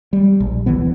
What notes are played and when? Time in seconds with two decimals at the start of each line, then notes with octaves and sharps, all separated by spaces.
0.13 G3
0.40 A#1
0.66 D1 D3 E3 B3